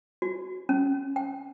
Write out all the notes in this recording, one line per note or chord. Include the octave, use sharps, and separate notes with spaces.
F#4
C#4
G5